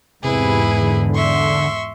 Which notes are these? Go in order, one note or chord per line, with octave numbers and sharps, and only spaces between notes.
E2 G#2 C3 E4 G#4 B4
D3
E5 C6 C#6